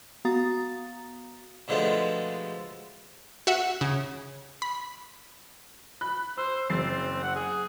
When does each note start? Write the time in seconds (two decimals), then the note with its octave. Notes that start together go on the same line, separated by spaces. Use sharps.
0.25 B3 F#4 F5 A#5 D#6 A6
1.68 B2 D3 F3 G#3 A3 B3
3.47 F#4 E5 F#5
3.81 C#3
4.62 B5
6.01 B5 F#6
6.38 C5 E6
6.70 F#1 C4 A6 C7
7.23 F#5
7.35 G#4